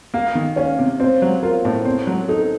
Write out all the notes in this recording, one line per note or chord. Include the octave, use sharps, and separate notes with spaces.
A#3 F5
D#3
C#4 C#5
C3
C4 C5
F#3
F4 A#4
A2
C4
F#3
D#4 A4